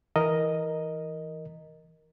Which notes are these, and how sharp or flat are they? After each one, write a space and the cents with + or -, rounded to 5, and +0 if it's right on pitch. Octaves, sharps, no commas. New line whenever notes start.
E3 -10 A#4 +0 D#5 +0